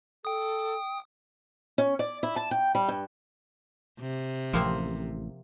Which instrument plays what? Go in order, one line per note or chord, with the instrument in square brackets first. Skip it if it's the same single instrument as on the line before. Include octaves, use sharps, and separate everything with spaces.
[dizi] A4 [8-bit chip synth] G5 D#6
[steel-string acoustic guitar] C#4
D5
E4
A5
G5
G3
G2
[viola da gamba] C3
[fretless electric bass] A1 [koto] F3 A#3 C4